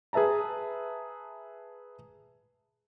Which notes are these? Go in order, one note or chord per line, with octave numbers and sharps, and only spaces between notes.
G#4 B4 E5 A5 A#5